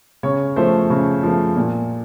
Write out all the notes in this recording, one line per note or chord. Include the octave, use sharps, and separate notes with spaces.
C#3 C#5
F3 A3 C5
C#3
F3 A3
A#2